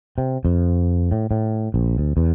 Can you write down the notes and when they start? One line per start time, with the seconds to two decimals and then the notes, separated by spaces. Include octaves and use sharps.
0.18 C3
0.45 F2
1.12 A2
1.31 A2
1.74 A#1
1.98 D2
2.17 E2